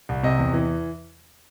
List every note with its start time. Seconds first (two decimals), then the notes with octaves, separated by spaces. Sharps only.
0.09 C2
0.23 C3 D#5
0.39 E2
0.53 E3